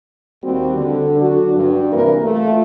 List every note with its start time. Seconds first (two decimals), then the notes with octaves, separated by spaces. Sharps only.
0.43 D#2 G3 C4 F#4
0.77 D3
1.21 F#3 D4 F#4
1.56 G2 D4
1.93 C3 E3 A#3 A#4
2.23 A3 F4